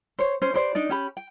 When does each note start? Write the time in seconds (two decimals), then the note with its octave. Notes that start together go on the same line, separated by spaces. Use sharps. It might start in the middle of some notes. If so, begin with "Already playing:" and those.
0.19 C5 C#5
0.42 C#4 C5
0.54 G4 B4 C5 D5
0.75 D4 D#4 D5
0.89 C#4 G4 B5
1.17 G5